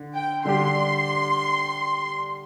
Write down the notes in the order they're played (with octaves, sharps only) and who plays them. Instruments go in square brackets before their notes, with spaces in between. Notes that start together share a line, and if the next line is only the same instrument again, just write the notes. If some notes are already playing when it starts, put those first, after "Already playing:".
Already playing: [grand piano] D3
[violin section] G5
[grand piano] D3 G3 D4 G4 [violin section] C6